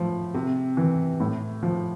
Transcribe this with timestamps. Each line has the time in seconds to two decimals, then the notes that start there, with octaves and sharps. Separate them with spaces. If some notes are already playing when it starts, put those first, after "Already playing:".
Already playing: A2 F3
0.34 C3
0.77 E3
1.20 A2
1.63 F3